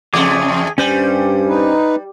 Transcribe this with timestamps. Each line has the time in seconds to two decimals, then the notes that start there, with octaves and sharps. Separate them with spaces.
0.14 E2 C#3 A3 G#4 D6
0.78 G2 G3 C#4 C5 G#5
1.49 D#4 B4